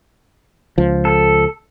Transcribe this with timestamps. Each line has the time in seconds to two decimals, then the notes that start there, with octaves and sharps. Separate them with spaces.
0.78 C#2 F3
1.05 A4